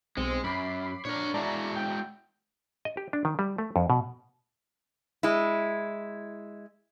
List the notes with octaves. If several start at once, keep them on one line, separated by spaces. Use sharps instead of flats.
B1 G#3 C4 C#7
F#2 B5 D6 C7
A#2 D4 A#4 C#5
G#3 E4 F#4 D5 A5 A#5
G5
D#5
G4
D4
D#3
G3
A3
F2
B2
G#3 E4